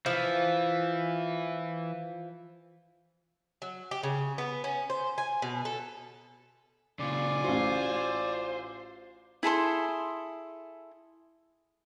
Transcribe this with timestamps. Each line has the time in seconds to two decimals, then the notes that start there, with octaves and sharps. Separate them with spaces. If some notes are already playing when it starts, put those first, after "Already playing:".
0.06 E3 F3
3.62 F#3
3.91 G4
4.03 C#3
4.38 B3
4.64 C#4
4.90 C5
5.18 G#5
5.42 B2
5.65 A4
6.99 A#2 C#3 F4 D5 G#5
7.44 A1 F#4 C5
9.43 E4 G#4 A4 C6